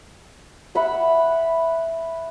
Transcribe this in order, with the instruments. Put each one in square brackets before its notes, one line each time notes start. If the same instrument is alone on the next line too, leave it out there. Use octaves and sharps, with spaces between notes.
[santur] E5 F#5 B5 C#6